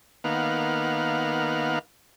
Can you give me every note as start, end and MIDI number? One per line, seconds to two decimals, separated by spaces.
0.24 1.79 51
0.24 1.79 58
0.24 1.79 59
0.24 1.79 77
0.24 1.79 78